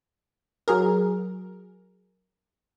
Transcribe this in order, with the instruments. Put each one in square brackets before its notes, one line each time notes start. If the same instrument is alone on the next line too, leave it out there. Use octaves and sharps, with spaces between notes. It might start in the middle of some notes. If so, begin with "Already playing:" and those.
[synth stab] F#3 G#4 A#4